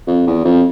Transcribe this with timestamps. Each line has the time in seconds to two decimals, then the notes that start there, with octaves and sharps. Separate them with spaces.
0.07 F2
0.27 E2
0.45 F2